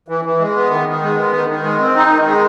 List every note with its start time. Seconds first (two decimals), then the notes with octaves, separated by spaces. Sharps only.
0.08 E3
0.25 E3
0.40 G#3
0.55 B3
0.70 D#3
0.87 D#3
1.03 G#3
1.17 B3
1.34 D#3
1.48 D#3
1.64 G#3
1.80 C4
1.95 D#4
2.10 D#3
2.26 G#3